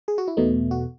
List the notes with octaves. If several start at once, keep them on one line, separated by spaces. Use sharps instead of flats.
G#4
F#4
E4
E2 B2 A3 D#4
F#4